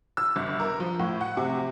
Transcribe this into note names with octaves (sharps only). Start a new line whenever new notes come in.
E6
G1
A#4
F3
A2
F#5
C3